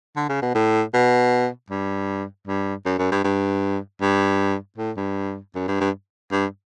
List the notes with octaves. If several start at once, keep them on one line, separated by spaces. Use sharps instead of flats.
D3
C#3
B2
A2
B2
G2
G2
F#2
F#2
G2
G2
G2
A2
G2
F#2
G2
G2
G2